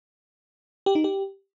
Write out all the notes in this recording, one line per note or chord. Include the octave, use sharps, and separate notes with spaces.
G4
D#4
G4